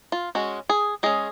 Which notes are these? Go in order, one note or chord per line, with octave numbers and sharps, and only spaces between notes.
F4
G#3 C#4 F#4
G#4
G#3 C#4 G#4